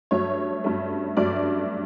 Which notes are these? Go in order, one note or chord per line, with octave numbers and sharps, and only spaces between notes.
G2 F#3 A3 C#5
G2 F#3 A3
G2 F#3 A3 D5